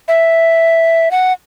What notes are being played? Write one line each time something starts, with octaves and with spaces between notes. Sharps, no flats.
E5
F#5